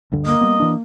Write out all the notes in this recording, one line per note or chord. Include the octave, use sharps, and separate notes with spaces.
D2 G2 D3
A#3 D#5
G3 B3
E3 D4